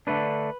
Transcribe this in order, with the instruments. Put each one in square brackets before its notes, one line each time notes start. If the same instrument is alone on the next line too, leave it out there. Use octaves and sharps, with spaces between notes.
[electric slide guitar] D3 A3 D4 B4